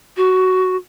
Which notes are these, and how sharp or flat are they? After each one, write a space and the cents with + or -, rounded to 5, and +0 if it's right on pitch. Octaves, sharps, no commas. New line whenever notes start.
F#4 +10